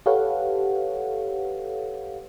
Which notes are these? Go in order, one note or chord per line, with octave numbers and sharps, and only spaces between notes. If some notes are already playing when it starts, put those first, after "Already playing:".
G4 A4 B4 C#5 F5 F#5